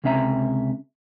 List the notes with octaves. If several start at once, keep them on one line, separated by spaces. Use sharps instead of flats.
C#2 C3 C#4 E5 A#5